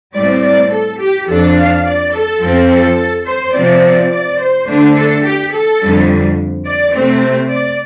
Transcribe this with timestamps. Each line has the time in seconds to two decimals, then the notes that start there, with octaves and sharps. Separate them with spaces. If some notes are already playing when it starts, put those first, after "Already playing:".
0.14 A2 G3 C4 D5
0.43 D5
0.71 A4
0.99 G4
1.27 F2 F3 D4 A4
1.56 F5
1.84 D5
2.13 A4
2.41 F2 F3 C4
2.70 A4
3.26 C5
3.54 C3 F3 C4 D5
3.83 D5
4.11 D5
4.39 C5
4.67 D3 A3 D4
4.96 A4
5.24 G4
5.52 A4
5.80 F2 D3 G3
6.65 D5
6.94 C3 A3 C4
7.50 D5